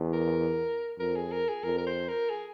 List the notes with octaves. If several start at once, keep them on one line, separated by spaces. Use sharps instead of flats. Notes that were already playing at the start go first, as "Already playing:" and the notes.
Already playing: E2
A#4
F2 A#4
G#4
A#4
G#4
F2 A#4
A#4
C5
A#4
G#4